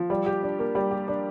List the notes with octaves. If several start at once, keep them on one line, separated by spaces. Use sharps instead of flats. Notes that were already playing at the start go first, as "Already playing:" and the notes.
Already playing: F3
G3
G4
D4
A#3
G3
G4
D4